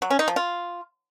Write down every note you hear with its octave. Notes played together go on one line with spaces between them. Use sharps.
F#3
C#4
D#4
F3
F4